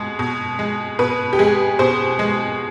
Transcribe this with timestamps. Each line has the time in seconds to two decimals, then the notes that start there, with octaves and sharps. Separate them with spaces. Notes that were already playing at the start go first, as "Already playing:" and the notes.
Already playing: B2 G#3
0.19 B2
0.59 G#3
0.99 B2 B4
1.33 G4
1.39 G#3 G#4
1.79 B2 C5
2.19 G#3